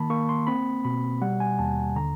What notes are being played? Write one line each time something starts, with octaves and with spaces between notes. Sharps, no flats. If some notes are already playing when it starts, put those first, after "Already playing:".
Already playing: D#3 A#3 A5 B5
A#3 C#6
C6
C4 B5
B2 B5
G3 F#5
G#5
D#2 A5
D3 A#5